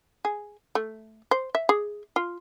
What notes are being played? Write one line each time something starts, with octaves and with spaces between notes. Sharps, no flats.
G#4
A3
C5
E5
G#4
F4